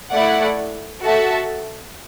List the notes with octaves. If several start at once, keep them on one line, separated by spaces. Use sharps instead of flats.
A3 E4 D5 F#5
F#4 A4 E5 A5